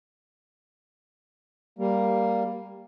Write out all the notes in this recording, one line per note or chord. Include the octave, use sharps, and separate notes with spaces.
G3 A#3